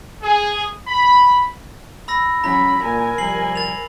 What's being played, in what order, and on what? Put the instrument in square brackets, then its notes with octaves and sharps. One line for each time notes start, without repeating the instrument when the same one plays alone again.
[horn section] G#4
B5
[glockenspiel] B5 E6 A#6
[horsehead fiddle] F#3 B5 [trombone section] C#4 [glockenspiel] A#5
[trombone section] A#2 [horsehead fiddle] A#4 G#5
[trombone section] C3 F3 G3 [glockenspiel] C7 F#7
[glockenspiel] A6 F7